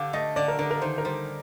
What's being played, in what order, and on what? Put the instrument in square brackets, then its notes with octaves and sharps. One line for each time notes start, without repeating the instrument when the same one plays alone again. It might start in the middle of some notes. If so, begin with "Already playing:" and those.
Already playing: [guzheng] D3 G4 [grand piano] F5
[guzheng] A3 [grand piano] D#5
[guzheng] D3 [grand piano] D5
[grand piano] A#4
[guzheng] D3 [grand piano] A#4
[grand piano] A#4
[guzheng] D#3 [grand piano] C5
[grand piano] A#4
[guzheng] G3 [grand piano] C5